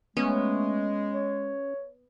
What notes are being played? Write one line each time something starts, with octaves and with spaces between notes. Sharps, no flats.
G#3 A3 B3 C#4
C#5